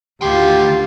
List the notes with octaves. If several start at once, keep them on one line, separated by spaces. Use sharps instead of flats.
D2 D#3 F4 G4 C6